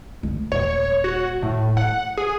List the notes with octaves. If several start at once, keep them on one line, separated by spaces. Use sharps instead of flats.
D2
D#1 C#5
F#4
A2
F#5
G#4